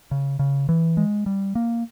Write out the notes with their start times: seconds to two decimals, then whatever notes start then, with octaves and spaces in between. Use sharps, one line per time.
0.11 C#3
0.39 C#3
0.69 E3
0.97 G#3
1.26 G3
1.55 A#3